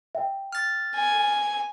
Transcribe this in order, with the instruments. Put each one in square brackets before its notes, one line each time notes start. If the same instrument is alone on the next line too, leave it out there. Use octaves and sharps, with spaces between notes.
[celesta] E5 G5
[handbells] F6 A6
[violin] G#5